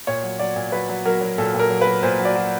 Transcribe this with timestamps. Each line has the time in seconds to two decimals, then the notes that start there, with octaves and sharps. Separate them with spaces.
0.07 A#2 C#5
0.23 F#3
0.39 F#3 D5
0.56 A#2
0.72 F#3 B4
0.89 F#3
1.05 F#3 A#4
1.21 F#3
1.38 A#2 A4
1.54 A#2
1.59 A#4
1.70 F#3
1.81 B4
1.87 F#3
2.03 A#2 C5
2.19 F#3
2.25 D5
2.35 F#3